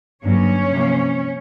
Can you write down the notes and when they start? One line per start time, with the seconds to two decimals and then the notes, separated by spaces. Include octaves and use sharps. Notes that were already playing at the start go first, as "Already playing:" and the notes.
0.24 G2 D3 F#3 A#3 C#4 C#5
0.73 C3 F3 A#3